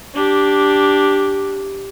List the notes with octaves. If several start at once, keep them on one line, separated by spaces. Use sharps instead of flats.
D4 G4